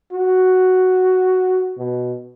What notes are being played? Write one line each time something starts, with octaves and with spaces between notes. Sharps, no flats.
F#4
B2